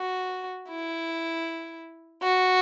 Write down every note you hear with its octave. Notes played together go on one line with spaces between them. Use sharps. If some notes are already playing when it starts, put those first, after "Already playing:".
Already playing: F#4
E4
F#4